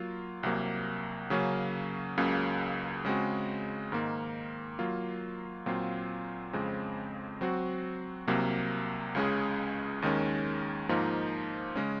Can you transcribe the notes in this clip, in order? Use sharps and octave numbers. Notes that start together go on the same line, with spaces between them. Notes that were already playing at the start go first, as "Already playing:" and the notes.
Already playing: F#3 A#3 F4
C2 C3 F#3 A#3
C#3 F#3 A#3 C#4
C#2 C#3 F#3 A#3
C#3 G#3 C4 F#4
G#2 D#3 A#3
F#3 A#3 F4
A#2 F#3 C4 F4
F2 C#3 G#3 C4
F#3 C4 F#4
C2 C3 F#3 A#3
C#2 C#3 G#3 C#4 G#4
D#2 D#3 G#3 C#4
G#2 F3 A#3 D#4
C#3 G#3 C#4